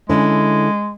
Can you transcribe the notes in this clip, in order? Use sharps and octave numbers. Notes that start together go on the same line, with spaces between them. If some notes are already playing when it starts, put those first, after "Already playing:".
D3 G#3 C#4 E4